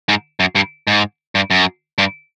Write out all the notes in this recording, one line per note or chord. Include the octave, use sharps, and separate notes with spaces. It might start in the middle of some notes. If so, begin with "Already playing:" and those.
G#2
F#2
G2
G#2
G2
F#2
G2